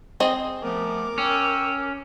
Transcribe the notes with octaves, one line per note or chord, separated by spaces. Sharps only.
C4 G#4 D#5
F3 A3 B3 A#4 D6
C#4 G5 E6